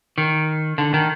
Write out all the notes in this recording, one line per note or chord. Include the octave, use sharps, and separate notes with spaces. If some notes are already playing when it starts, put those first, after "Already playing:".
D#3
D3
D#3